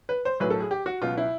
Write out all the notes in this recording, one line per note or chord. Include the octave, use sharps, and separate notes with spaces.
B4
C5
B1 A2 F#3 B4
A4
G#4
G4
F#4
C#2 B2 F#3 F4
E4